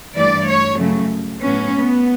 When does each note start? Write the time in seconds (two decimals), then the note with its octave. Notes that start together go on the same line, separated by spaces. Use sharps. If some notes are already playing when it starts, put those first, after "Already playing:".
0.14 G2 E3 A3 D5
0.46 C#5
0.78 F#2 C#3 F#3 A3
1.42 A2 F#3 B3 C#4
1.73 B3